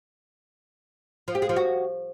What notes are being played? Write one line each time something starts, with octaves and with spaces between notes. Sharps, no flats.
F3
G4
G#3
F3
F#4